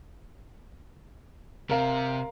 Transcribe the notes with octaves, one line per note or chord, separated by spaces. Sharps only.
C3 A#4 F5